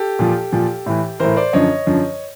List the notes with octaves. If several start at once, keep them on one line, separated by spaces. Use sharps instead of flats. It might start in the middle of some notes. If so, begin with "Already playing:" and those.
Already playing: G4 A4
A#2 F3
A#2 F3
A2 E3
A2 E3 A#4 C5
C5 D5
F#2 D3 F3 C#5 D#5
F#2 D3 F3